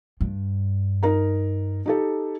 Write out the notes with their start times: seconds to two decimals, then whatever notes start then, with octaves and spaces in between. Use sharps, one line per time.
0.21 G2
1.03 D#4 A#4 A#5
1.86 D#4 G4 A4